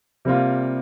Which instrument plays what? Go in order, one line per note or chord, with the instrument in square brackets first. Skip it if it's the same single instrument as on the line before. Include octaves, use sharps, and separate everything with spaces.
[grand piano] C3 G3 A#3 F4